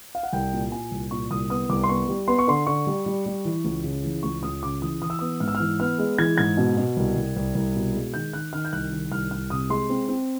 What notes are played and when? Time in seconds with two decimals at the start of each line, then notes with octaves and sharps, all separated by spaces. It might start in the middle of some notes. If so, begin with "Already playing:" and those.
0.15 F5
0.23 F#5
0.33 C2 G5
0.53 A#2
0.72 A#2 G#5
0.91 C2
1.11 A#2 C#6
1.31 C2 D#6
1.50 B3 D#6
1.69 C2 D6
1.84 C6
1.89 B3 C#6
2.08 G3
2.28 B3 C6
2.39 C#6
2.48 D3 C6
2.67 D3 C#6
2.87 G3
3.06 G3
3.26 G3
3.45 E3
3.65 C#2
3.84 C#3
4.04 E3
4.23 C#2 C#6
4.43 C#2 D#6
4.63 C#3 D6
4.82 E3 D#6
5.02 E3 D#6
5.10 E6
5.19 B3 D#6
5.40 G#2 F6
5.48 E6
5.55 F6
5.60 E3
5.80 B3 F6
5.99 G#3
6.18 E3 G#6
6.38 G#2 G#6
6.57 B2
6.77 B2
6.97 C2
7.16 C2
7.36 C2
7.55 C2
7.75 B2
7.94 G#3
8.14 D#3 G6
8.33 D#3 F#6
8.53 D#3 F6
8.65 G6
8.72 C2 F#6
8.92 D#3
9.11 C2 F6
9.31 C2 F6
9.50 C3 D#6
9.70 G#3 C6
9.89 C4
10.08 C4